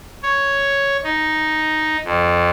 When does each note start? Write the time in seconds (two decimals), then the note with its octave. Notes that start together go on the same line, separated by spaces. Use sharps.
0.22 C#5
1.04 D#4
2.05 F2